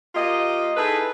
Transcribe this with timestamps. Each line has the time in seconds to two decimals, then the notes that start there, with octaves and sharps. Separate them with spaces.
0.15 A#3 F4 G4 D#5
0.76 D#4 E4 G#4 A4 B4